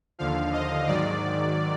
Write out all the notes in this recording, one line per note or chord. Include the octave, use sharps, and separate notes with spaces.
D#2 D3 F3 F5
D#5
G#2 D#3 F#3 D5